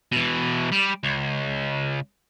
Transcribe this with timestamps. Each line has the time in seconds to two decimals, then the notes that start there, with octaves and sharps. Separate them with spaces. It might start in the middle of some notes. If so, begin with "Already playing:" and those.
0.12 B2 E3
0.72 G3
1.03 C#2